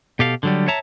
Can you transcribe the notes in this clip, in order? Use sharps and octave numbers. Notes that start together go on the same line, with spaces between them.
B2 G4 A4 F5
D3 F#3 G3
C#5 E5 A5 A#5